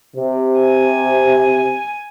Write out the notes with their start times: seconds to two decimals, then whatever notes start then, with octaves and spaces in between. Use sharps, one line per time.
0.16 C3
0.60 G#5